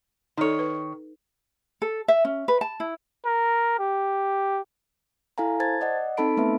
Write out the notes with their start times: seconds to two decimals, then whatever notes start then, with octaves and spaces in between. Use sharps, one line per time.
0.38 D#3 D#4 A4 C#5
0.59 B4
1.82 A4
2.08 E5
2.25 C#4
2.48 B4
2.61 A5
2.80 E4
3.26 A#4
3.79 G4
5.38 E4 A4 F5 G#5 A#5
5.60 C5 A5 G#6 A6
5.81 D5 D#5 F#5
6.17 C4 D#4 A4 A5 B5 D7
6.37 A3 B3 B4 E5